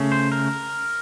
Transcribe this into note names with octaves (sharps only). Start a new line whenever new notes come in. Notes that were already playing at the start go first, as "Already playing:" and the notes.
Already playing: C#3 A3 C#4
C5
A#4